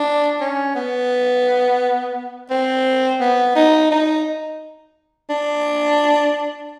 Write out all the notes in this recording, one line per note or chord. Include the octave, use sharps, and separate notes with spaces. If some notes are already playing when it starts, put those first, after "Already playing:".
Already playing: D4
C#4
B3
C4
B3
D#4
D#4
D4